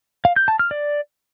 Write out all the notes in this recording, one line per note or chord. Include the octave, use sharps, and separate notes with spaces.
F5
G6
A5
F6
D5